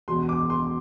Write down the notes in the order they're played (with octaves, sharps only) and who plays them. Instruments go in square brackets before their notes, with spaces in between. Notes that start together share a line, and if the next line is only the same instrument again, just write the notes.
[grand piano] E1 E2 B2 C6
D6
C6